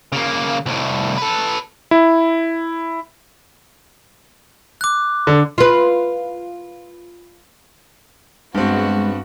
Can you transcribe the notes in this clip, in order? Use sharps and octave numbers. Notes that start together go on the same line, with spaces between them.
C#3 A#3
C2 A2
A4 B4
E4
D6 F#6
D3
F4 B4
G2 G#3 B3 C4 F#4